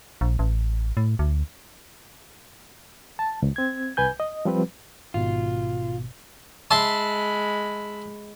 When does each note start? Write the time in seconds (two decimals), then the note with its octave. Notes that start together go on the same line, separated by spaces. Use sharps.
0.21 A#1
0.39 A1
0.97 A2
1.19 D2
3.19 A5
3.42 C#2
3.56 C4 G#6
3.97 C2 B4 G#5 G6
4.20 D#5
4.45 F3 G3 C4 B4
5.14 G#1 G#2 B2 F4
6.71 G#3 E5 A5 B5 C6